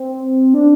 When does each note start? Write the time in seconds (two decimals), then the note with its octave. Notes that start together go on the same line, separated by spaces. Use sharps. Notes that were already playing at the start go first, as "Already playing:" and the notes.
Already playing: C4
0.54 D4